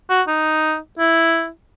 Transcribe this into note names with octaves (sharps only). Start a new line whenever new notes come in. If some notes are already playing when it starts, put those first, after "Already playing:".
F#4
D#4
E4